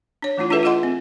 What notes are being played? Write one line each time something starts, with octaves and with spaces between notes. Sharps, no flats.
D4 C#5
E3 A3 D4 E4 F4
D4 F4 G#4 A4 B4 E5
F4 G#4 A4 D#5 F#5 C6
C4